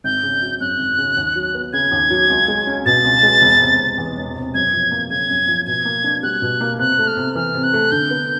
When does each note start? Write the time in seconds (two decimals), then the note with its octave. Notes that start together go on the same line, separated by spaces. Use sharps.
0.04 G#1 G6
0.23 C#3
0.42 F#3
0.60 F#2 F#6
0.79 G#1
0.98 C#3
1.17 D#2
1.36 F#3
1.55 B3
1.73 C#3 G#6
1.92 D#2
2.10 F#3
2.30 C#2
2.48 G#3
2.67 C#4
2.86 B2 A6
3.04 C#2
3.23 G#3
3.42 E1
3.61 C3
3.79 E1
3.98 E2
4.17 E1
4.36 C3
4.54 F#2 G#6
4.73 F3
4.91 A#3
5.10 C#3 G#6
5.29 F#2
5.48 F3
5.67 B2 G#6
5.85 A#3
6.04 D4
6.23 G3 F#6
6.42 B2
6.61 A#3
6.79 C3 F#6
6.98 A3
7.07 F6
7.17 C3
7.35 E3 F6
7.54 C3
7.64 F#6
7.73 A3
7.92 D3 G6
8.11 B3